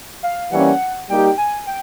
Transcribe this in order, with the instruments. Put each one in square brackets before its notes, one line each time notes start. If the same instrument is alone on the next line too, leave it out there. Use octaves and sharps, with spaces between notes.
[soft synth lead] F5
[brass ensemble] E3 G3 A#3 C#4 [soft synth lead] F#5
[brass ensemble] G3 A#3 D#4 G4 [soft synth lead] G5
[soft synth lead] G#5
G5